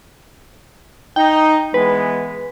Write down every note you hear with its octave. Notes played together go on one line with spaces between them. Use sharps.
D#4 G5
E3 G#3 B3 B4